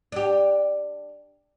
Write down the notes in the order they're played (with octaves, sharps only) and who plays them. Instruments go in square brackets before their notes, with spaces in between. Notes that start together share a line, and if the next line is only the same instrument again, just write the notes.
[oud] D4 G4